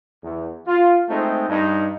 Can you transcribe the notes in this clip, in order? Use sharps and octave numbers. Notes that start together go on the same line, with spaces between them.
E2
F4
G#3 A3 C4 D#4
G2 D#4